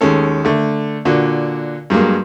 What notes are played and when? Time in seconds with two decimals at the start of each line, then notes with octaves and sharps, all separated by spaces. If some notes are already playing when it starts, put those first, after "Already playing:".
0.01 D#2 G#3 C#4 A4
0.45 D3 A3
1.05 A#2 D3 F#4
1.90 G2 F#3 G#3 A#3